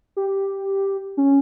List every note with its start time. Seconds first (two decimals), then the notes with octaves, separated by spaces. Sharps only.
0.17 G4
1.17 C#4